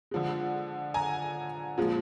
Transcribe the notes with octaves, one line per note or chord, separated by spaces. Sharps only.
D3 F3 G#3
G#5 A#5
A#2 F3 G#3